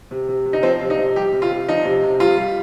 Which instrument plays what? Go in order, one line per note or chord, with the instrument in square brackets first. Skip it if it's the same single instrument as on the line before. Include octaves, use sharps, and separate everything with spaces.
[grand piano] C3
C3
C3
D#4
F3 C4
C3
D#4
C3
G3 G4
C3
F4
C3
F3 D#4
C3
C3
G3 F4
G3